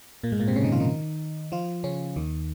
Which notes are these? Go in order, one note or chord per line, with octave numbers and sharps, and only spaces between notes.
A#2 A#3
G#2 G#3
A#2 A#3
C3 C4
C#3 C#4
D#3 D#4
F3 F4
D#3 D#4
F3 F4
C#3 C#4
D#2 D#3